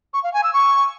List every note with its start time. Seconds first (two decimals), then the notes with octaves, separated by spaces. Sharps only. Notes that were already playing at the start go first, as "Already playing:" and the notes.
0.14 C#6
0.23 F5
0.33 G#5
0.43 E6
0.53 C#6